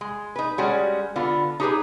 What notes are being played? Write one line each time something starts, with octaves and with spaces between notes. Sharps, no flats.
G#3
D#4 B4
G3 G#3 C#4 F#4 G4
D3 B3 F4
D#4 G4 G#4 B4